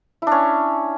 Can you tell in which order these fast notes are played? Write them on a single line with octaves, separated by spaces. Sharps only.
E4 D4 C#4